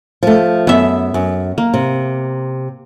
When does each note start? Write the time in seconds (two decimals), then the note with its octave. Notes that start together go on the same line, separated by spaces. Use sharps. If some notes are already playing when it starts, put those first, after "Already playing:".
0.23 F3 A3
0.67 F#2 B3 E5
1.14 F#2
1.58 A#3
1.74 C3